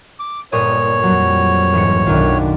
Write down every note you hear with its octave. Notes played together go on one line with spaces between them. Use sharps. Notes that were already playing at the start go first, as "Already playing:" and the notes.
D6
G1 A#2 C#5 D#6
F2 F#3 G3
E1 G#2 C#7
B1 F#2 D#3 D4 F4